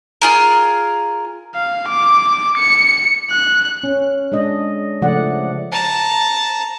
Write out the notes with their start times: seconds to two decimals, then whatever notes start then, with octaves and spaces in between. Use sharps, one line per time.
0.22 F4 G#4 A#4
1.55 F5
1.88 D6
2.58 C#7
3.31 F#6
3.83 C#4
4.32 G#3 D4 D#5
5.02 C#3 F3 A3 D5 F#5
5.72 A5 A#5